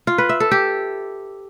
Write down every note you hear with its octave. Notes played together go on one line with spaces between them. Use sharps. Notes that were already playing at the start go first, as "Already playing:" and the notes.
F4
B4
E5
A4
G4